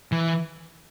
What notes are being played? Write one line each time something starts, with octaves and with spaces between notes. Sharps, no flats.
E3